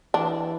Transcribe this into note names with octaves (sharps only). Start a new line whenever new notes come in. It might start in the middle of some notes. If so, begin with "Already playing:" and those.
E3 D4